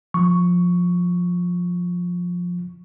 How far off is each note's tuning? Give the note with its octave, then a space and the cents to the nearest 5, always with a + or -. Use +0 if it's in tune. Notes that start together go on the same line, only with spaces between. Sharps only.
F3 +15 C#6 +5